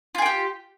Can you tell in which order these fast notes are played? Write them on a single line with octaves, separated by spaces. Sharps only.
F4 G#4 G5 G4